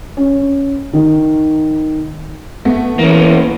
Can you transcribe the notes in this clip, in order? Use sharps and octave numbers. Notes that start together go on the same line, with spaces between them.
C#4
D#3
A3 B3
E3 A#3 C#4